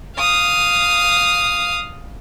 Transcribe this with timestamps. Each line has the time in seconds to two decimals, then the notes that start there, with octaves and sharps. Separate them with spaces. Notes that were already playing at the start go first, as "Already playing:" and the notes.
0.18 F5 D#6